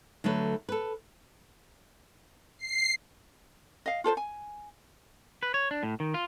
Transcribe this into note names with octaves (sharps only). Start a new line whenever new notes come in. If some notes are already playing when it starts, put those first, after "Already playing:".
D3 F#3 A3 B4
A4 B4
C7
D#5 F5
F4 A4 B4 C5
G#5
B4
C#5
D4
A2
D#3
F4